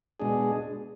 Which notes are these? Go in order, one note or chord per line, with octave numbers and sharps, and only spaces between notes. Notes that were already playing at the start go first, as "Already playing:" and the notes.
B2 G#3 D4 G#4